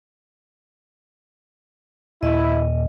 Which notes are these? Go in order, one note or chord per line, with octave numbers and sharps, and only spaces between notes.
D#2 A#2 E4 D#5